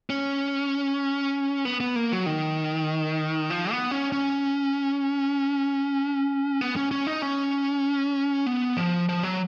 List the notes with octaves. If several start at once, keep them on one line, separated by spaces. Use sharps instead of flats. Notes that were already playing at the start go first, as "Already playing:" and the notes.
C#4
B3
B3
A#3
F#3
D#3
F3
B3
C#4
C#4
B3
C#4
C#4
D#4
C#4
B3
F3
F3
F#3